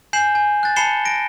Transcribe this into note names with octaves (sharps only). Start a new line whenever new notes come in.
G#5 G6 C7 E7 F#7
G#5
F#6 A6
A5 B5 C7 C#7 E7 G7
A#6 D7